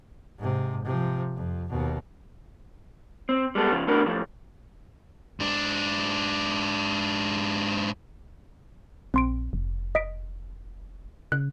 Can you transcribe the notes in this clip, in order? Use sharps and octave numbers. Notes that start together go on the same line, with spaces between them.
G#2 C3
C3 F3
F2
D#2 B2
C4
G3 G#3 B3 A4
C#3 F3
A3 B3 D4 F#4 A#4
A2 F3 A3
G#2 D4
A#1 C4 C6 D7
F1
D#5 B6 D7
C#3 F#6